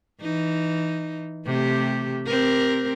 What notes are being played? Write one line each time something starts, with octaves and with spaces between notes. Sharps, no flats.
E3 D#4
C3 A3 G4
C4 G4 A#4